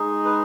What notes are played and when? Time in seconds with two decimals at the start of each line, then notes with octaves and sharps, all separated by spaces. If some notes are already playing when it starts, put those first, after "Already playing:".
Already playing: G#3 D#4 G#4
0.25 B4